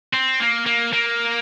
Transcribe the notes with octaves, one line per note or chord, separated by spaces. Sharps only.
C4
A#3
A#3
A#3